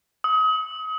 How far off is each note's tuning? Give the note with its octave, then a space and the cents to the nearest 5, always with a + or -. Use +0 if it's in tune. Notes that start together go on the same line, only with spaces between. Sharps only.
D#6 +35